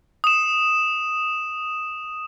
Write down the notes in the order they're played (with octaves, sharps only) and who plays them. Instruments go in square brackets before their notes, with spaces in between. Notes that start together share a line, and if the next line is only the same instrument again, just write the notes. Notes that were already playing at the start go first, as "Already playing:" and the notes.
[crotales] D#6 E7